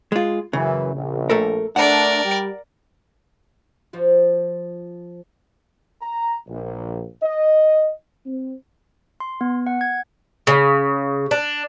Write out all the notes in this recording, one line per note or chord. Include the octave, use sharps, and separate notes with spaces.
G#3 F4
F#2 C#3 E3
A#1
A3 A4 A#4
A3 D4 A#4 D5 F#5
G3 G4
F3 F4 F#4
A#5
A#1
D#5
C4
C6
B3
F#5
G#6
C#3
D4